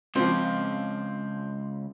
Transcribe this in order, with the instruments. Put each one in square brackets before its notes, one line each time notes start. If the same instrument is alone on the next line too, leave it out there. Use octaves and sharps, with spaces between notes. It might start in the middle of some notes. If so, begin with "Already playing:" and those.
[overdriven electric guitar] C#2 [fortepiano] F3 C4